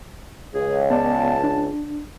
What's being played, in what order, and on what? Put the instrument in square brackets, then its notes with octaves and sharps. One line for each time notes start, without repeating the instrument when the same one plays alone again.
[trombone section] C#2 [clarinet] G#4
[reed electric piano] B3 D5 [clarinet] A5
[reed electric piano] D4